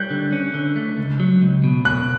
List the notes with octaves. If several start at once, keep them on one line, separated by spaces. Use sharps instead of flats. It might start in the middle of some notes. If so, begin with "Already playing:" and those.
Already playing: G3 F#6 G6
D3
C#4
D3
A3
C#2
F#3
C#2
B2
B2 F#6